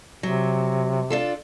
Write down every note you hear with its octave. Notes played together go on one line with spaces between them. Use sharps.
C3 F#3
D4 F4 A4